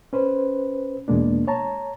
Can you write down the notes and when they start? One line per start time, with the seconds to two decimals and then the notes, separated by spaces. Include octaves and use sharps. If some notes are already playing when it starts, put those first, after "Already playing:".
0.13 C#4 B4 C5
1.08 E2 B2 G#3 A#3 D4
1.47 C#5 A5 A#5